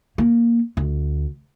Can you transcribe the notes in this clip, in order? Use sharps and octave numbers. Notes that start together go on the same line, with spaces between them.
A#3
D2